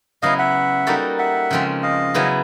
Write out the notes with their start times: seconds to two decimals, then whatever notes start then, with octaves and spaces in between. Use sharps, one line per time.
0.22 C#3 F#3 B3 E4 D#5 F5
0.39 E5 F#5
0.87 G3 A#3 D#4 F#4 A4
1.19 E5 F#5
1.51 C#3 F3 G#3 C4
1.83 D#5 F5
2.14 C#3 F#3 B3 E4